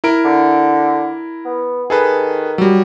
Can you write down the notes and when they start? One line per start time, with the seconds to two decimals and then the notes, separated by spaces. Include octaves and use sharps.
0.04 E4 A#4 D7
0.24 D3
1.45 B3
1.90 D#3 G#4 A4 B4
2.58 F#3 G3